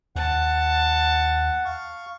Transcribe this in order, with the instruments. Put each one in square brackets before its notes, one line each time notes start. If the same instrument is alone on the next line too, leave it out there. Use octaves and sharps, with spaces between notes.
[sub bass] D#2 [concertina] F#5 [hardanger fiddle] A5
[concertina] F5 C#6